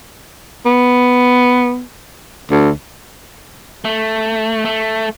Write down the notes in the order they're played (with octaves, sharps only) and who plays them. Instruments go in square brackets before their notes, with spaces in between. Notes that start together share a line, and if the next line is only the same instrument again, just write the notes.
[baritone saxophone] B3
D2
[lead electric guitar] A3
A3